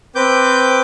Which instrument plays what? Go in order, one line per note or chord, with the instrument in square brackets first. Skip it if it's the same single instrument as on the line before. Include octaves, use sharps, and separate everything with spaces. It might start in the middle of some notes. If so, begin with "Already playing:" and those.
[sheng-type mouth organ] C4 B4 D6 G6